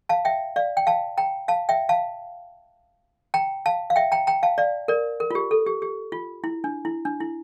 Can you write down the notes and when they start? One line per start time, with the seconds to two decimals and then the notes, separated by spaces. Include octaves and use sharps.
0.09 F5 A5
0.25 E5 G5
0.56 D5 F5
0.77 G5
0.87 F5 A5
1.18 G5 A#5
1.48 F5 A5
1.69 E5 G5
1.89 F5 A5
3.34 G5 A#5
3.66 F5 A5
3.90 F5
3.96 E5 G5
4.12 G5 A#5
4.27 G5 A#5
4.43 F5 A5
4.58 D5 F5
4.88 A#4 D5
5.20 A#4
5.31 F4
5.35 G4
5.51 A4
5.67 G4
5.82 G4
6.12 F4
6.44 E4
6.64 D4
6.85 E4
7.05 D4
7.20 E4